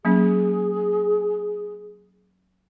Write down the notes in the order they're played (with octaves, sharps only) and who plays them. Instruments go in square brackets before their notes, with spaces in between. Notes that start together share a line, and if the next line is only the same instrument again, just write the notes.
[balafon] F#3 A#3 C#4 [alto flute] G#4